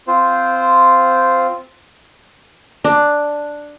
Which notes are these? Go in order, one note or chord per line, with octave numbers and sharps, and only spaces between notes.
C4 F4 C5
D4